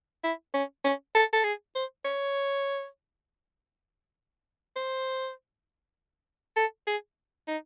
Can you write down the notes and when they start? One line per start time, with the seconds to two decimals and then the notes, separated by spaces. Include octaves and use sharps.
0.24 E4
0.54 C#4
0.84 C#4
1.15 A4
1.33 A4
1.44 G#4
1.75 C5
2.05 C#5
4.76 C5
6.56 A4
6.87 G#4
7.48 D#4